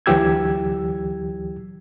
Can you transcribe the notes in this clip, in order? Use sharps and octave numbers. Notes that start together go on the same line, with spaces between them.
D2 E3 F#3 G4 E6 G#6